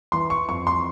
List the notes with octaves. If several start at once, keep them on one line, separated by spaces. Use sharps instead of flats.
E3 C6
C#6
F2 C#6
C6